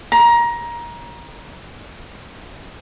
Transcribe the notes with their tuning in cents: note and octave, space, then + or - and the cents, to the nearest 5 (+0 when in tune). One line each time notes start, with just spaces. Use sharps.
A#5 +20